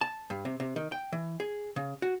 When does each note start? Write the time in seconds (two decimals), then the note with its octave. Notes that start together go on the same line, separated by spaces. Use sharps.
0.01 A5
0.30 G2
0.45 C3
0.60 C3
0.76 D#3
0.92 G5
1.12 E3
1.40 G#4
1.76 C#3
2.02 F#4